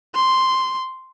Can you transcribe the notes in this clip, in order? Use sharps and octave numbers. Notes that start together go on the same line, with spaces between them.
C6